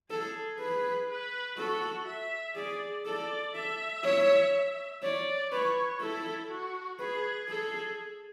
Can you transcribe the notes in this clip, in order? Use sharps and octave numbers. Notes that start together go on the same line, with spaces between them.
G#4 A4
B4
B4
F#4 A4
E5
G#4 D5
A4 D5
A4 E5
C#5
C#5 D5
B4 C#5
E4 A4
F#4
G#4 B4
G#4 A4